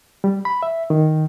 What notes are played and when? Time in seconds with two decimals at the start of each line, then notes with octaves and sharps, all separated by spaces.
0.24 G3
0.45 B5
0.63 E5
0.90 D#3